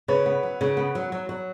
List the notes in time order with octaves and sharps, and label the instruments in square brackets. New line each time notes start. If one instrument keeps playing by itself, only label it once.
[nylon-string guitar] C#3 [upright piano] B4 C#5
[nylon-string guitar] B3
F#3
C#3
B3
F#3
F#3
F#3